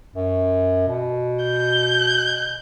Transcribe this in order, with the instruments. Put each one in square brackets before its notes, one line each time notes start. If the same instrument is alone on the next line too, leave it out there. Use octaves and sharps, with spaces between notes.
[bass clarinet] F#2
B2
[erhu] G6